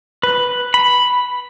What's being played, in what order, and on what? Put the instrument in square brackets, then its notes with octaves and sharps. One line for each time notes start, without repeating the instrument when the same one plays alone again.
[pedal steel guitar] B4
B5